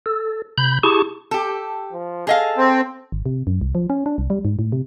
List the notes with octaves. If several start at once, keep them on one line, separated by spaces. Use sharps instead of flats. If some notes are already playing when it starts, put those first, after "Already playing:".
A4
C3 B5 G6
E4 G4 G#4 A5 C#6
G4 A4
F3
G#4 A4 D#5 F5
C4
G#1
C3
F#2
C2
F3
C#4
D4
C2
G3
G#2
A2
C3